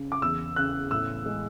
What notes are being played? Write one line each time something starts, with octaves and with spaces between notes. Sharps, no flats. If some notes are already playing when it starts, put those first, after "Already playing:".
Already playing: C#3
D6
E2 E6
C#3 F#6
A2 E6
G#3